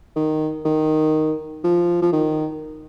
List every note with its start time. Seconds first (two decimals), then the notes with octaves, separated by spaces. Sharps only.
0.16 D#3
0.65 D#3
1.64 F3
2.02 F3
2.12 D#3